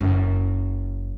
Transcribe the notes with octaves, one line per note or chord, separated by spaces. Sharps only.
F#1 F#2